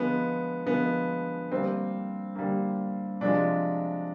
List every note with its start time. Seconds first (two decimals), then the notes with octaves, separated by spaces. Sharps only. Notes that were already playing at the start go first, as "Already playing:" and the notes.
Already playing: D3 F3 G#3 B3
0.66 D3 F3 G#3 B3
1.52 D3 G3 A#3 C4
2.35 D3 G3 A#3
3.21 C3 F3 G#3 D4